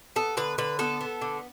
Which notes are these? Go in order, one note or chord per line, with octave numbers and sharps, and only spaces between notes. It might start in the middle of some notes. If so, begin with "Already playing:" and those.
B3 A4
D3 B4
D3 B4
B3 A4
B3
D3